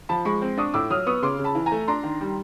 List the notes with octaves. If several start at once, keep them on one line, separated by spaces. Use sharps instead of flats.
F3 A5 B5
G#3 B5 C#6
C4
D4 C#6 D#6
A2 D6 E6
F#3 D#6 F6
B3 C#6 D#6
C#3 C6 D6
C#3
A5 B5
E3
G#5 A#5
A3
D4 A#5 C6
D#3
G3